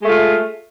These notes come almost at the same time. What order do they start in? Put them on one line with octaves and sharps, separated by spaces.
G#3 A3 F4